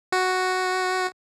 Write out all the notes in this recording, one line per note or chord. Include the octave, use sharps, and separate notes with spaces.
F#4